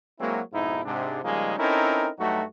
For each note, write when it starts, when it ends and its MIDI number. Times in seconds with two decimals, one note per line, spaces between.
0.19 0.40 54
0.19 0.40 56
0.19 0.40 58
0.19 0.40 60
0.19 0.40 64
0.19 0.40 66
0.53 0.84 41
0.53 0.84 44
0.53 0.84 47
0.53 0.84 63
0.53 0.84 64
0.85 1.20 44
0.85 1.20 48
0.85 1.20 62
1.23 1.54 49
1.23 1.54 53
1.23 1.54 55
1.23 1.54 56
1.23 1.54 58
1.23 1.54 63
1.58 2.08 60
1.58 2.08 61
1.58 2.08 63
1.58 2.08 64
1.58 2.08 69
1.58 2.08 70
2.18 2.43 43
2.18 2.43 54
2.18 2.43 57
2.18 2.43 63
2.18 2.43 66